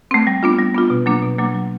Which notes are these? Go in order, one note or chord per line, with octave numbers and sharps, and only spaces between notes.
A3 C4
G3
B3 D4 F4
G3
B3 D4 F4
B2
F#3 A#3 D4
B2
F#3 A#3 D4
F#3